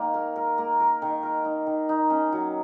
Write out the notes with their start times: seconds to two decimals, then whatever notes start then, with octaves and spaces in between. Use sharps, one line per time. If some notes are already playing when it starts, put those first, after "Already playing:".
Already playing: D#3 A#3
0.14 A#4
0.36 A#4
0.58 A#3
0.80 A#4
1.02 D#3
1.23 A#4
1.45 D#4
1.66 D#3
1.89 D#4
2.10 C#4
2.33 F#3